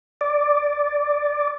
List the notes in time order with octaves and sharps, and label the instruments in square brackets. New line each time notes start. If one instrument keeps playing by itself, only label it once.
[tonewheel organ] D5